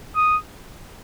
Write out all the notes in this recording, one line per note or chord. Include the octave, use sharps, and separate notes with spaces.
D#6